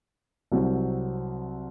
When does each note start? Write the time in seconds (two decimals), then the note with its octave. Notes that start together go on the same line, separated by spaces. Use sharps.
0.52 C2 C3 F#3 C4